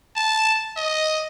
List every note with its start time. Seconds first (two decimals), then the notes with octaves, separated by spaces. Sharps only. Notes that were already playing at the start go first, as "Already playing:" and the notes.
0.16 A5
0.76 D#5